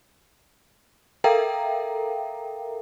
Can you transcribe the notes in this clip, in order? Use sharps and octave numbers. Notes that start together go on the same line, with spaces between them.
A4 A#4 E5 F5 G5 A#5